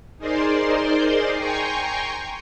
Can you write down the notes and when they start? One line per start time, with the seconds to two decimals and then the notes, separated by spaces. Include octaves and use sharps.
0.18 D#4 G#4 A#4 C5 D5 C6
1.36 G5 G#5 A#5 C6 C#6 G6